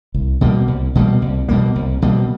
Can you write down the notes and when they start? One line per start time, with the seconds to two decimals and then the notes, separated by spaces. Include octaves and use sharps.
0.14 C2
0.41 B2 G3 A#3
0.68 C2
0.95 B2 G3 A#3
1.22 C2
1.49 B2 G3 A#3
1.76 C2
2.02 B2 G3 A#3